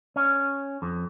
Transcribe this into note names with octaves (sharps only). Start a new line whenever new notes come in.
C#4
F2